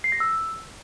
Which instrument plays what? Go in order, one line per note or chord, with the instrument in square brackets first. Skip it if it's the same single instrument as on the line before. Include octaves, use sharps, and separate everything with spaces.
[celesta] C7
A#6
E6